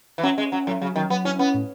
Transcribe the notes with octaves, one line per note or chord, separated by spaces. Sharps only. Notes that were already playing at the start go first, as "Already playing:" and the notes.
E3
F#3 C#4
G#3 C#4
F#3 C#4
A2 F#3
C#3 F#3
D#3 F#3
F#3 B3
C#4 E4
B3 C#4
A2